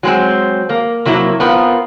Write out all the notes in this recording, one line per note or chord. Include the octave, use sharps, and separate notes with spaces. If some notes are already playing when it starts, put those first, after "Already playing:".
F#3 G#3 C4
A#3
C3 F#3 A#3 E4
B3 C4 F4 A#4